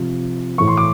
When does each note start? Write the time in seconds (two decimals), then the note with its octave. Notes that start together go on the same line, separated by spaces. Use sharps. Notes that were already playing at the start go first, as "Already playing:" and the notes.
Already playing: C3 F3
0.58 A2 E3 C#6
0.68 C6
0.77 D6